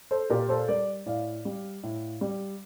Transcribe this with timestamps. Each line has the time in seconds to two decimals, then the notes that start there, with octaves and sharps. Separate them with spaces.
0.11 A4 C5
0.30 A#2 G4 A#4
0.49 A4 C5
0.68 G3 A#4 D5
1.06 A2 D5 F5
1.45 G3
1.83 A2
2.21 G3